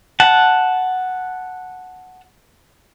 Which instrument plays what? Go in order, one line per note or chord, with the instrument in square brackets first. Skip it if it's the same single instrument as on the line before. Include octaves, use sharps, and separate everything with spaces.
[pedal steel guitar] F#5 A5